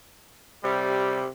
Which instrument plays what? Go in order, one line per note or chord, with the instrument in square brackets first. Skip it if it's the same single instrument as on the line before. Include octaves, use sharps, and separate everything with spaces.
[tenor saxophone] C3 [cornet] G3